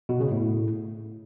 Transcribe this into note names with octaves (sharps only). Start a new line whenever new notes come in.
B2
C#3
A2